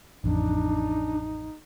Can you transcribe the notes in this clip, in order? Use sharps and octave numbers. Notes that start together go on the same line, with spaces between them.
A1 F2 D4 D#4